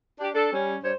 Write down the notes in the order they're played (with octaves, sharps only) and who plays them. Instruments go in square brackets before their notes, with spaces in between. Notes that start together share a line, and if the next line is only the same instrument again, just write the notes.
[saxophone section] D4 G4
D4 A4
G3 C#4
G2 G3 C5 C#5